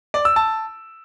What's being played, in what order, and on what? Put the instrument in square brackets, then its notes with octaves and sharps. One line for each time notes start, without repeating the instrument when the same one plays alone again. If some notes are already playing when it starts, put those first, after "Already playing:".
[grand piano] D5
E6
A5